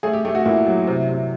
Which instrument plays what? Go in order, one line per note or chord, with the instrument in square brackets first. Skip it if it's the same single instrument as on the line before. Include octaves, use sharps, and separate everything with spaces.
[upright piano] A3 G#4
G4
A3 G4
F#4
A#2 E4
F#3
C3
C3